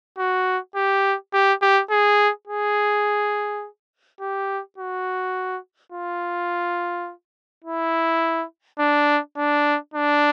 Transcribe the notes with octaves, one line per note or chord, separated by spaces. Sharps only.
F#4
G4
G4
G4
G#4
G#4
G4
F#4
F4
E4
D4
D4
D4